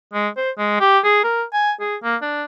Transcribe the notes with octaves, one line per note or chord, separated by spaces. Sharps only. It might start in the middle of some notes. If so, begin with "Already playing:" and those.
G#3
C5
G#3
G4
G#4
A#4
G#5
G#4
A#3
D4